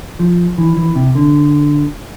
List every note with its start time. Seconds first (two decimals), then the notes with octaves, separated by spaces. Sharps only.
0.19 F3
0.58 E3
0.77 E3
0.95 C3
1.15 D3